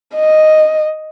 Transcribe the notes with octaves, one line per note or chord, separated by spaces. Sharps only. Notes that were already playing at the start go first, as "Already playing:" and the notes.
D#5